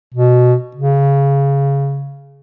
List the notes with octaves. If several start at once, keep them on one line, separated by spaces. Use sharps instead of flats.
B2
C#3